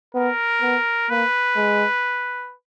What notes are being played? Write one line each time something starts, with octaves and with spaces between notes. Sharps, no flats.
B3 A#4
B3
A#3 B4
G#3